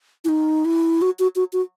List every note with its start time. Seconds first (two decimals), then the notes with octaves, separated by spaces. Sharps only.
0.25 E4
0.29 D#4
0.65 E4
1.02 F#4
1.19 F#4
1.36 F#4
1.53 F#4